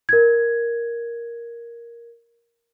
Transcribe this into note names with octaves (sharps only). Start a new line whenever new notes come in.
A#4 G#6